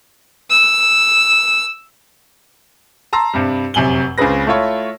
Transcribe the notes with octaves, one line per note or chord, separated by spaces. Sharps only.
E6
A5 A#5 C6 E6
G2 C3 G3
F1 F#2 C3 G#5 F#7 G7
C#2 C#3 C4 G#4 B4 A#6
A3 E4 F4 C#5